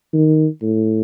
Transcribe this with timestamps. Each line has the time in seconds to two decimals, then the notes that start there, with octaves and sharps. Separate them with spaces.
0.14 D#3
0.62 A2